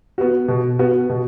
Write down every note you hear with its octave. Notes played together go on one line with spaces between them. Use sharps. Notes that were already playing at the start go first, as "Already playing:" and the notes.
B3 F#4
B2
B3 F#4
B2